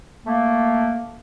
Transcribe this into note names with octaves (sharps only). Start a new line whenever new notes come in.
A3 A#3